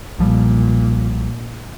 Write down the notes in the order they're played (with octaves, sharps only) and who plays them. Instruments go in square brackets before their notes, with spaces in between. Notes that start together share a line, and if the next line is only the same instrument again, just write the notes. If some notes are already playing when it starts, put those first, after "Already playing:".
[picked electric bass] B1 F3 G3 [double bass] A#2